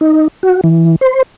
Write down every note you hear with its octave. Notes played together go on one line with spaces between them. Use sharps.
D#4
F#4
E3
C5